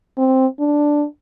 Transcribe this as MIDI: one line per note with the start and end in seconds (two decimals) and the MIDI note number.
0.18 0.47 60
0.60 1.06 62